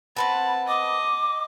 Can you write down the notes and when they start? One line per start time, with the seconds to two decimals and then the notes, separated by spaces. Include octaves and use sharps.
0.17 C4 B4 F#5 A5 B5
0.68 D#5 D6